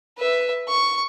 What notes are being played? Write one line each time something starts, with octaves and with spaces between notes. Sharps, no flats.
B4 E5
C#6